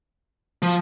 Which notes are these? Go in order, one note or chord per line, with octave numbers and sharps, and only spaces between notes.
F3